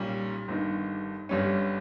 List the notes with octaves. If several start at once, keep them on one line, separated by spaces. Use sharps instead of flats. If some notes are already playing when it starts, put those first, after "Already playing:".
Already playing: B1 A#2 G3 C#4
G1 G2 D#3
G1 G2 G3 C#4